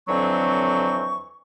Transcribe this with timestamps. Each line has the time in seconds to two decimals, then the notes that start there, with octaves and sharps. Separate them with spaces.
0.08 F2 D3 E3 F#3 C4 C#6